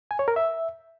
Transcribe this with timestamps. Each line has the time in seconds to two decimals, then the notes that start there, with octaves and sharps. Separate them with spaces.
0.11 G#5
0.19 C#5
0.28 A#4
0.36 E5